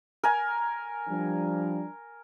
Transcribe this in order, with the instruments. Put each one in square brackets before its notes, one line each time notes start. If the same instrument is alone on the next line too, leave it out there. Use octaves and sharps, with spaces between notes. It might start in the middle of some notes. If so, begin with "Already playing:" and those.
[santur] A#4 G#5
[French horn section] F3 G3 D4